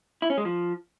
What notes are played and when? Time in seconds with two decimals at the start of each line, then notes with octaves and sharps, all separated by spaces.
0.22 E4
0.30 C#4
0.38 G#3
0.45 F3